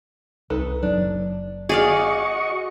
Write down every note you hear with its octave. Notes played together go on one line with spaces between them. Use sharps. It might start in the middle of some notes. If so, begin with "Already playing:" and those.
C2 D#4 A4 B4
F#1 C2 F#3 D4
F#4 G#4 D5 D#5 F5 C#6